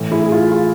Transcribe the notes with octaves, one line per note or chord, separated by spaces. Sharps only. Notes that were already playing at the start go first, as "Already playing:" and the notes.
Already playing: A2 E3
E4 G#4
G#4
F4
F4